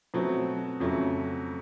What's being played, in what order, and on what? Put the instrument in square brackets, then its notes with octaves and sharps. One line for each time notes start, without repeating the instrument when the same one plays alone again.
[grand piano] B2 F#3 A3 C4
F2 C#3 F#3 A3